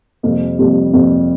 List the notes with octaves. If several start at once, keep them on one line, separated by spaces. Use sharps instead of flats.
F2 C3 G3 A#3
F2 C3 G3 A#3
F2 C3 G3 A#3